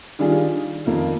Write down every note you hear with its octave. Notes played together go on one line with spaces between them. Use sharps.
D#3 G3 D4 F4 G#4
F2 D#3 A#3 F4